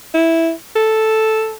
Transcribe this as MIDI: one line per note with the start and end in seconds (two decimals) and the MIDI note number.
0.14 0.52 64
0.76 1.55 69